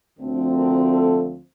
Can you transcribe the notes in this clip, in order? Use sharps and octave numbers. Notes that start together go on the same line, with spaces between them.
D2 D3 F3 A3 C4
A#4
A4